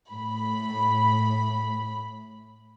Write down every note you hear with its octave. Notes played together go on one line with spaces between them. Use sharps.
A2 B5